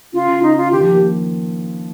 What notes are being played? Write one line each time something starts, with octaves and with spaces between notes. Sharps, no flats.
C#3 F4
C#3
C#3 D#4
F4
D#3 G4
F3
G4
A#3